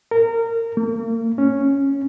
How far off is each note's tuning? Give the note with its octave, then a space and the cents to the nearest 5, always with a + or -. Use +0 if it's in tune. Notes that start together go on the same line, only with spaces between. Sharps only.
A#4 -25
A#3 -35
C#4 +0